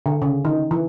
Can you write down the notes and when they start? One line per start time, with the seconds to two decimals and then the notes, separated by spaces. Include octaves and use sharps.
0.06 D3
0.22 C#3
0.45 D#3
0.71 E3